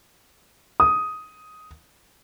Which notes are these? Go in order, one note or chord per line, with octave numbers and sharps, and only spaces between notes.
D#6